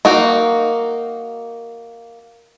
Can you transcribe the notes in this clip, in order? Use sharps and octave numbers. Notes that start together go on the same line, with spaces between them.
A#3 D#4 F#4